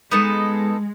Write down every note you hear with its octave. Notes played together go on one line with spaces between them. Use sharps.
G#3 B3 D#4 A4